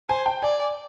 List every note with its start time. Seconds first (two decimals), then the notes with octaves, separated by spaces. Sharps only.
0.09 C5 G#5
0.26 G5
0.42 D5 G#5